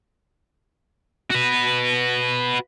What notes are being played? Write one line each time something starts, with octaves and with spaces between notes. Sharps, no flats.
F#4 B4